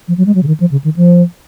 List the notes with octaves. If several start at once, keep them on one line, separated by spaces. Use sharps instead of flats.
F3
F#3
G#3
F#3
C#3
D#3
F3
C#3
D#3
F3